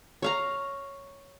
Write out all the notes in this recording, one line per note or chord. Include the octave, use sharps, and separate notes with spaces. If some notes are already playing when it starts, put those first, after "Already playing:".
C#5 F5 A#5